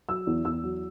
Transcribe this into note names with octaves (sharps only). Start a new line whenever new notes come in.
F#3 E6
E2
E2 E6
F#3